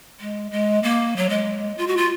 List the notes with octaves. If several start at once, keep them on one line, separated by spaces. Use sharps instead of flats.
G#3
G#3
A#3
F#3
G#3
F4
F#4
F4